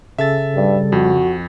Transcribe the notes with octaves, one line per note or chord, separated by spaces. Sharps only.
C#3 A4 E5 A6
G2 G3
F2 F#4